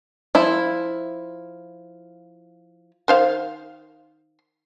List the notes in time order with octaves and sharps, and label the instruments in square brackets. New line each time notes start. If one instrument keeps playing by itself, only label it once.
[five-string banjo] F3 E4
[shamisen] D#3 C5 F5